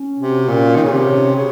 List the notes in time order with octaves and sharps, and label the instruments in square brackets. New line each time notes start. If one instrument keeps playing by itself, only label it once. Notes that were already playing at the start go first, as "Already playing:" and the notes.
Already playing: [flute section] C#4
[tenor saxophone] C3 [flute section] F#4
[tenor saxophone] A#2 [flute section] C#4
[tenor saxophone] D#3 [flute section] C#5
[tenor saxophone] C#3
C3
[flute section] C#4
[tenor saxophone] C#3 [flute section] F#4